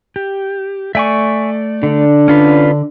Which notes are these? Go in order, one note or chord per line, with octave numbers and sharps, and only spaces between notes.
G4
A3 D5 E5 G#5 C#6
D3 D4
C#4 F4 B4